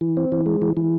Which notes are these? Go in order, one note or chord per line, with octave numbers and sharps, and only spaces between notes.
E3
C4
E3
G#3
E3
E3